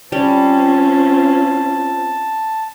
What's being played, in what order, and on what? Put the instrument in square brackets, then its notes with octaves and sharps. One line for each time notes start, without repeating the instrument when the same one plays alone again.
[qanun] G3 [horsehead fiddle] C4 F4 [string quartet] C#4 [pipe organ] A5